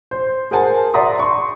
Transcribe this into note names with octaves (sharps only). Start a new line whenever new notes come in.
C5
G#4 A#4 C5 F#5 G#5 A5
D5 E5 F#5 A#5 C6 D#6
C6 C#6